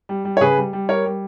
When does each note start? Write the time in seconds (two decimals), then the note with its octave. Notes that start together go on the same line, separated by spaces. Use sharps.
0.09 G3
0.25 G3
0.37 C#5
0.41 C#3 G#4 B4
0.57 G3
0.73 G3
0.89 G3 A#4 C#5
1.05 G3